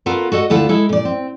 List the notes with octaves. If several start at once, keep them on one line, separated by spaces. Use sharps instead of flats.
B3 F4 F#4 A4 A#4
F#4 A4 D#5 F#5
D2 E4 F4 A4 F#5
G#3 E4 A4
A#2 D5
C4